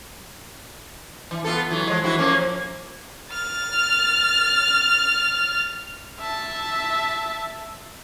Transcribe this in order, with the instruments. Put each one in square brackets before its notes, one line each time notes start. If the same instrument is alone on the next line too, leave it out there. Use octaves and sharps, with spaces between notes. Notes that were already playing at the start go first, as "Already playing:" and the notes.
[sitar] E3
B3 F4 A4
E3 F#3
F3 G#3
E3 E4 F#4
F3 A#3 C#4
[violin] F6 A6
[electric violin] E5 A5